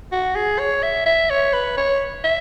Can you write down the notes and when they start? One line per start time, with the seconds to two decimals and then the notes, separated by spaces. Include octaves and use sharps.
0.12 F#4
0.36 G#4
0.59 C#5
0.83 E5
1.06 E5
1.30 C#5
1.53 B4
1.77 C#5
2.24 E5